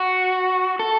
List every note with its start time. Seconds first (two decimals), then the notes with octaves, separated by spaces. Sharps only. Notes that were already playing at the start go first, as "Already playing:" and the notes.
Already playing: F#4
0.79 A4